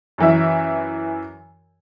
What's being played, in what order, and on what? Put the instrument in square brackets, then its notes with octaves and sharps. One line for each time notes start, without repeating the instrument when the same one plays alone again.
[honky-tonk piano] F#2 E3 E5